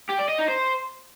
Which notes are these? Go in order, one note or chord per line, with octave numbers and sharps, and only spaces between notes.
G4
D5
D#5
D#4
C5